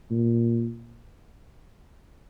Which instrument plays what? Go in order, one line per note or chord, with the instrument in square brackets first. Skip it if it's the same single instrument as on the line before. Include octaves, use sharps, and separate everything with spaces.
[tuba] A#2